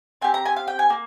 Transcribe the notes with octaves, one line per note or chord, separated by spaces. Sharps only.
C4 G4 G#5
A#5
G#5
F5
G5
G#5
A#3